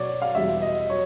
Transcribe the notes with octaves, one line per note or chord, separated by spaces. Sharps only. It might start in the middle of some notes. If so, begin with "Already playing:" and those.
Already playing: B2 F#3 C#5 D5
F5
E2 B2 G3 E5
D#5
F#3 C#5